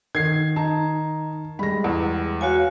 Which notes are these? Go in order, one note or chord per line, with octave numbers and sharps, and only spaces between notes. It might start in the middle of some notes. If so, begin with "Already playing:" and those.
D#3 G#6 C7
D#4 A5
G3 G#3 B5 A#6
E2
F#4 C#5 F5 G#5